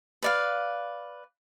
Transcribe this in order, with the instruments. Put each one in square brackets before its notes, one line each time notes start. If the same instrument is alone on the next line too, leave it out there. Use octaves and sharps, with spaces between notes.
[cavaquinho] B4 D5 F5